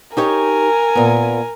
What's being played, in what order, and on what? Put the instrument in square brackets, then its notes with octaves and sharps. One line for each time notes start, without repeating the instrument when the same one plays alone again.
[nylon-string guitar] D#4 G4 C#5 [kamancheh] A#4 G#5
[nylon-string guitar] A#2 B3